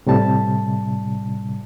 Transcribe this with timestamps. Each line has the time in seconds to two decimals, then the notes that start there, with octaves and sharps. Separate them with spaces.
0.06 A2 C3 G3 A5